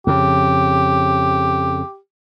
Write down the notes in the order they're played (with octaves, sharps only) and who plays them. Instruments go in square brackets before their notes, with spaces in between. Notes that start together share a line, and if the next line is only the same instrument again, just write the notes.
[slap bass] F2 C#3 [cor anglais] G4